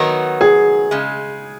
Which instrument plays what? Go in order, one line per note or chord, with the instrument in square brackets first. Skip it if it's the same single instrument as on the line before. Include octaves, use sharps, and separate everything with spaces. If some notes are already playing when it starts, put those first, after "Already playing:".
Already playing: [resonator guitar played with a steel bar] D#3 F#3 B3 D#4
[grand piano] G#4
[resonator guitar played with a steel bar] C#3 G#3